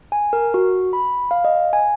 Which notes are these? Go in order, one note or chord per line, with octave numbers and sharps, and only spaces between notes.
G#5
A#4
F#4
B5
F5
D#5
G#5